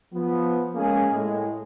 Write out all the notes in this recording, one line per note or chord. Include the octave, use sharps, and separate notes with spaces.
F3 B3
G#3 A#3 C#4 G#4
A2 G#3